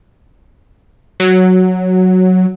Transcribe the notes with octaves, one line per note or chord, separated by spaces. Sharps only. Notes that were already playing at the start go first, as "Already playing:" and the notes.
F#3